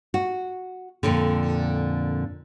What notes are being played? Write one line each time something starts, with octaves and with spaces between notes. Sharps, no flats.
F#4
F2 A#2 D3